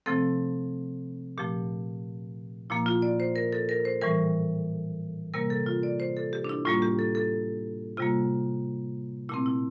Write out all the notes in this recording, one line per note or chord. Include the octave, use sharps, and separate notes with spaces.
C3 F3 A3 C4 A4
A#2 F3 A3 G4
A#2 F3 A#3 E4
F4
D5
C5
A#4
A4
A#4
C5
A2 E3 G3 A#4
C3 G3 A#3 A#4
A4
F4
D5
C5
A4
G4
D4
E4
A2 G3 A#3 F4
G4
A4
A4
C3 G3 A#3 F4
A#2 A3 C4 E4
E4